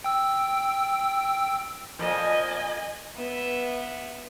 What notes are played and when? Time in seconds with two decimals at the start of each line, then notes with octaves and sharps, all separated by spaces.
0.04 G5 E6
1.99 F2 A#2 F3 D#5 G#5
3.16 B3 E5